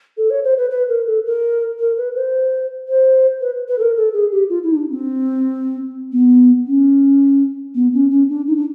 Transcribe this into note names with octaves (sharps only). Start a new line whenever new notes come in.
A4
C#5
C5
B4
B4
A#4
A4
A#4
A#4
B4
C5
C5
B4
B4
A4
A#4
A4
G#4
G4
F4
E4
D#4
D4
C4
B3
C#4
B3
C#4
C#4
D4
D#4
D4